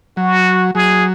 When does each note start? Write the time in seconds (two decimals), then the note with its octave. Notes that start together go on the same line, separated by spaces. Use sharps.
0.17 F#3 F#4
0.75 F#3 G#4